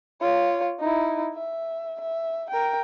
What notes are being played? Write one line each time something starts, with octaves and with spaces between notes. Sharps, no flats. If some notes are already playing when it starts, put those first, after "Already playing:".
F4 C#5
D#4 E4
E5
E5
A#4 G5